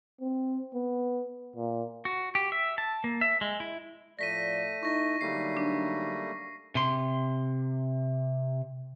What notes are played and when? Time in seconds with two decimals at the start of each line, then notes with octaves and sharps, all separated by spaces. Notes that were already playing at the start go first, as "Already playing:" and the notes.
0.21 C4
0.74 B3
1.56 A#2
2.05 F#4
2.35 G4
2.52 E5
2.78 A5
3.04 A#3
3.21 E5
3.41 G#3
3.60 E4
4.19 A2 F3 A3 D5 A#6 B6 D#7
4.83 D#4 E4 C#6 A#6
5.21 D3 F#3 G3 A3 A#3 D#4 C7
5.57 D4
6.75 C3 C6